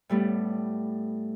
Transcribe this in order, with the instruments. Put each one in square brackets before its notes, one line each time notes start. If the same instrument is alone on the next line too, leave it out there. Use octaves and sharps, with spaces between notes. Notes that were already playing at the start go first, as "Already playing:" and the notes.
[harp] A2 G3 A3 B3